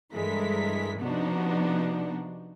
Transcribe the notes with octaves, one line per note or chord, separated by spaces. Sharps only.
G2 E3 G#3 A4 A#4 B6
C3 F3 B3 D4 D#4 F#4